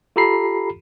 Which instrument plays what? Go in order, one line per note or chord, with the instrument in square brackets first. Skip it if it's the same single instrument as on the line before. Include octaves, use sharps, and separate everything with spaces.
[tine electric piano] F4 G4 A4 A#5 B5 C7